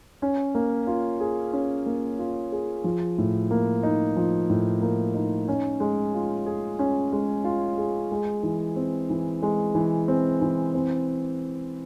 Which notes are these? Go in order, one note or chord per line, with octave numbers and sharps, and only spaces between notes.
C#4
A#3
F4
G#4
C#4
A#3
F4
G#4
F3
A2
A#3
D#4
F3
A2
A#3
D#4
C#4
G#3
F4
G#4
C#4
G#3
F4
G#4
G#3
E3
C4
E3
G#3
E3
C4
E3
C4